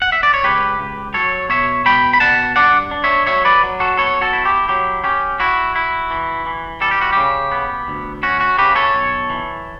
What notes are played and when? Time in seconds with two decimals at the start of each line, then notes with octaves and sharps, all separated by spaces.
0.02 F#5
0.12 E5
0.23 D5
0.34 C#5
0.43 C#2 G4 B4
0.79 C#2
1.14 F#3 A4 C#5
1.49 B2 C#5 E5
1.85 B2 G5 B5
2.13 B5
2.20 B2 F#5 A5
2.56 G2 D5 F#5
2.91 D4
3.04 C#5 E5
3.27 F#3 C#5 E5
3.45 B4 D5
3.63 F#3
3.80 F#4 A4
3.97 B3 A4 C#5
4.21 F#4 A4
4.33 E4
4.45 G4
4.69 F#3 G4
5.04 C#4 G4
5.40 E4 F#4
5.76 E4
6.11 E3
6.46 E3
6.81 G3 A4
6.91 G4
7.01 F#4
7.13 C#3 G4
7.52 B3
7.88 D2
8.23 C#4 F#4
8.41 F#4
8.58 C#3 G4 B4
8.75 A4 C#5
8.94 B1
9.29 E3